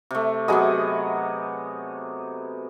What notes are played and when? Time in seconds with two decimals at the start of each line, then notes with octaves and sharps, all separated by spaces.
0.11 C3 A3
0.48 C3 F#3 B3 G#4 D#5